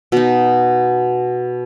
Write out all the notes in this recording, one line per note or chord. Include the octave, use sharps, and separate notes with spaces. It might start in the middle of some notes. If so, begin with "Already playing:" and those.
B2 D#4